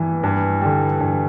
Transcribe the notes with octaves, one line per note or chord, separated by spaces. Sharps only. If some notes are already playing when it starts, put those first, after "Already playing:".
Already playing: G2 E3
G2
D3 G3
G2